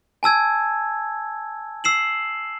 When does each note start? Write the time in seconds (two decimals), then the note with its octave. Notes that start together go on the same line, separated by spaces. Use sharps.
0.23 G#5 A5 E6 G#6
1.84 E6 C7 E7 F#7